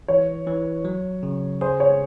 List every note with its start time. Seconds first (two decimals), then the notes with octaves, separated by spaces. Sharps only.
0.08 E3 C#5
0.47 E3
0.85 F#3
1.23 C#3
1.61 G#4 C5
1.80 C#5